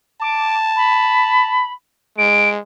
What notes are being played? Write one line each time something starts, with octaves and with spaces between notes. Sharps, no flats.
A5 D6
B5
G#3 D7